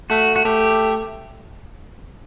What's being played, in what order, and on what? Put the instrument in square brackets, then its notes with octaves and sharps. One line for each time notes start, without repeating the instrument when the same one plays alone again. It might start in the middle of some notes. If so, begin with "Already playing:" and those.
[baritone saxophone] A3 [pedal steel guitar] F#4
[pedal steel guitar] F#4
[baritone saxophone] A3 [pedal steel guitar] G4